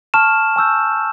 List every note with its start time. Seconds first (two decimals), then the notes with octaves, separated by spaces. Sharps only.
0.14 A5 C#6 F6 E7
0.56 G#5 C#6 E6 G6